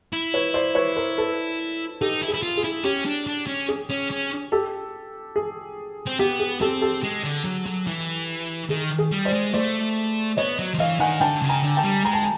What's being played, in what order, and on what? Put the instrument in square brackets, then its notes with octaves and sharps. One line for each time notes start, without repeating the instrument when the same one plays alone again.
[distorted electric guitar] E4
[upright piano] B4 C#5
C5 D5
B4 C#5
A#4 C5
A4 B4
[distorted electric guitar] D#4 [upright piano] G4 A4
[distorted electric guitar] E4
[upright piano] G#4
[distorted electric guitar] E4
F4
[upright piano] G#4
[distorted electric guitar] E4
[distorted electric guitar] C#4 [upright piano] G4
[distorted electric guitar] D4
D4
C#4
[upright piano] G#4
[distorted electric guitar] C#4
C#4
[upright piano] G4 A4
G#4
[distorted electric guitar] C4
[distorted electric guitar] B3 [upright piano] G4
[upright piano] G#4
[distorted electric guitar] C4 [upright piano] G4 A4
[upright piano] G4 A4
[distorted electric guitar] G#3
D3
F#3
F#3
E3
[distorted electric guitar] D#3 [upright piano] G#4
[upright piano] G#4
[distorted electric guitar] G3
[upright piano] C5 D5
[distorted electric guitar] G#3
[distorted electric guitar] A3 [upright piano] C5 D5
[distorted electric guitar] B3 [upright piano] C#5 D#5
[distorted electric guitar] F#3
F3
[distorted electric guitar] E3 [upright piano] D#5 F5
[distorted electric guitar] D#3 [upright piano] F#5 G#5
[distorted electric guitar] D3 [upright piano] G5 A5
[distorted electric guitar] C#3
[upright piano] G#5 A#5
[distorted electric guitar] D3
[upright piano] G5 A5
[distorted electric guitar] G3
[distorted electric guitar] G#3 [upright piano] A#5
[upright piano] A5
G#5